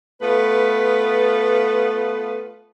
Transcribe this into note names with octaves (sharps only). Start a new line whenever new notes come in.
A3 B3 F4 B4